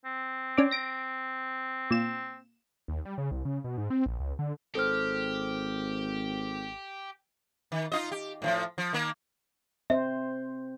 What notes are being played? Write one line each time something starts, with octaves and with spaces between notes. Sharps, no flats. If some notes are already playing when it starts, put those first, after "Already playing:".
C4
C#4 D4 D6
A#6 D7
A#2 E7
D#2
G3
C#3
C2
C#3
B2
G#2
C4
A#1
C#2
D3
G#1 G4 A4 C5 F6
D#3
D#4 F4 D#5
G4
A2 E3 F3
F3
D#3 A#3
C4 C5 E5